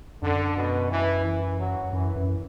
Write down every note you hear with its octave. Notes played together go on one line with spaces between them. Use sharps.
F#2 D3
B2
E3
E3
F#3
F#2 E3
F#2